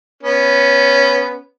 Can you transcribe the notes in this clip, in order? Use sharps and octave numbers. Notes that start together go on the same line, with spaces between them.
B3 C#4